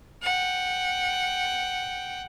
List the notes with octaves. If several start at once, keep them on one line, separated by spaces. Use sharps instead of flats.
F#5 G5